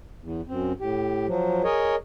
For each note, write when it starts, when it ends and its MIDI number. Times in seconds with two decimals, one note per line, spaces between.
0.22 0.41 40
0.48 0.72 42
0.48 0.72 60
0.80 1.27 45
0.80 1.27 67
1.27 1.62 53
1.27 1.62 54
1.64 1.95 68
1.64 1.95 70
1.64 1.95 73
1.64 1.95 75